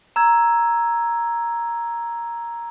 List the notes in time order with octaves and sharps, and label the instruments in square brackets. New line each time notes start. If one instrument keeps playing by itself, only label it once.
[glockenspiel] A#5 E6 G#6